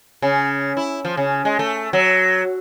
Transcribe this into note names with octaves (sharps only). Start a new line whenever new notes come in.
C#3
E4
F3
C#3
G#3
A3
F#3